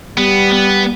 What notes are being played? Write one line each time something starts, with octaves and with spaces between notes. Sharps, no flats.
G3 B3
B3